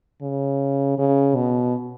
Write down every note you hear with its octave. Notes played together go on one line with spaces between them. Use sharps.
C#3
C#3
B2